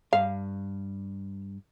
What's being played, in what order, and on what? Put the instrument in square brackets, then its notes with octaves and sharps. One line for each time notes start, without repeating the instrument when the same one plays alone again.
[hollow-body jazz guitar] G2 [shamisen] F5